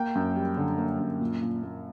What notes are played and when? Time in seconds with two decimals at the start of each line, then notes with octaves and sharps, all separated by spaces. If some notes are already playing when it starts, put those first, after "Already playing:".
Already playing: A#3 G5
0.15 F#2
0.36 G3
0.57 D3
0.78 A#3
0.99 F#2
1.21 A#2
1.42 A#2
1.63 A#3